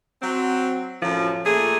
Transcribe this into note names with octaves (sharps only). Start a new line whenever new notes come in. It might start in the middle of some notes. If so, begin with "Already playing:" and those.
F#3 C4
F#2 A2 F3
A#2 A3 G#4